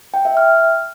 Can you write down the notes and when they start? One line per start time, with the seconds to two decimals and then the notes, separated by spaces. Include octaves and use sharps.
0.14 G5
0.25 E5
0.37 F6